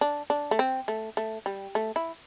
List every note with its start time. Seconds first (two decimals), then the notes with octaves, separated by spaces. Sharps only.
0.01 D4
0.30 D4
0.51 A3
0.59 C4
0.88 A3
1.17 A3
1.46 G3
1.75 A3
1.96 E4